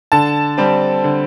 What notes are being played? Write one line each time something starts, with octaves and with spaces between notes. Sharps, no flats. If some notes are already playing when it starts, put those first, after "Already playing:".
D3 A5
G3 C4
D3